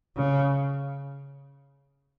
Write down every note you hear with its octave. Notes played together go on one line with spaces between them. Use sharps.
C#3